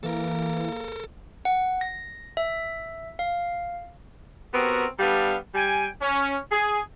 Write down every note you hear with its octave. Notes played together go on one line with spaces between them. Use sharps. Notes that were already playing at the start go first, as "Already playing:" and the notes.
E3 A#3 A4 A#4
F#5
A#6
E5
F5
B3 C4 F#4 G4 A#4
G3 B3 D4 A4 F5
G3 G5 G#5
C#4
G#4